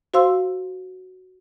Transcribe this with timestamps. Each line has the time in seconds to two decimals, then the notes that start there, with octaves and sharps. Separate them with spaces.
0.14 F#4 C5 F5 C6 E6